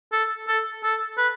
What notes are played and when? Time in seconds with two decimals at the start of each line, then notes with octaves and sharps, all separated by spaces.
0.13 A4
0.48 A4
0.84 A4
1.18 B4